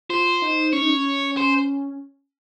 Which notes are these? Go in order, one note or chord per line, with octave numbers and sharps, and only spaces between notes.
F4 C5
D#4
C#4 C#5
D#4
C#4
C5